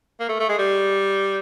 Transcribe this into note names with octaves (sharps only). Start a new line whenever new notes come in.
A#3
A3
A3
G#3
G3